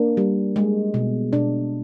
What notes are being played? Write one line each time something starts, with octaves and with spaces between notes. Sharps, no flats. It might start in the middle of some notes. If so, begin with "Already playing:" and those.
Already playing: A#3 D4
G3
G#3
B2
B2 D4